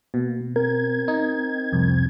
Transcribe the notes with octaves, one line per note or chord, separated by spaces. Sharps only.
B2 A#3
C4 A#4 G#6
D#4
C2 F2